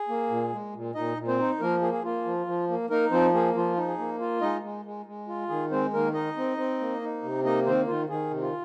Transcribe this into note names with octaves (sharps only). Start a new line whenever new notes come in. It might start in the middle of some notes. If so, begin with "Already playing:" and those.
Already playing: G#4
A#3
A#2
G#3
A#2
A#2 D#4 D#5
A#2
C4 C5
D#4
F3 A#3 A#4
A#3 G#4
G#4
A#3 F4
F3
F3
A#3
A#3 D#4 A#4
F3 C4 C5
A#3 G#4
F3 F4
D#4
G#4
A#3
F4
G#3 D#4 D#5
G#3
G#3
G#3
F4
D#3 G#4
G#3 C4 C5
D#3 A#3 A#4
D#4 D#5
C4
C4
A#3
D#4
C3
A#3 D#4 D#5
D#3 C4 C5
D#3 F4
D#3 G#4
C3
F4